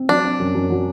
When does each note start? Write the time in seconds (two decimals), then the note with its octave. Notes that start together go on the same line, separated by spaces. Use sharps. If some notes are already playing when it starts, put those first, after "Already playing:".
Already playing: C4
0.09 F#3 D4
0.24 C4
0.40 F#2
0.55 F#2
0.70 F#3